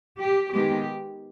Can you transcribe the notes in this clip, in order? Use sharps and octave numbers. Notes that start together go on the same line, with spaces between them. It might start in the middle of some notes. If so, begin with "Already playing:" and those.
G4
D#3 G#3 B3 G4